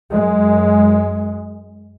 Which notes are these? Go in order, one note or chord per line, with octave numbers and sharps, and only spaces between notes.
F#2 G#3